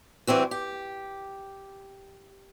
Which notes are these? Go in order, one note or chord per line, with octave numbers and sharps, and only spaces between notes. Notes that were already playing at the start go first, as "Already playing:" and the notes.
E3 G3 C4 F#4
G4